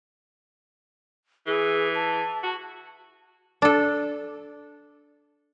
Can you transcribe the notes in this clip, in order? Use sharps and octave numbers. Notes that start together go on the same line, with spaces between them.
E3 G#4
A5
F#4
D4 A4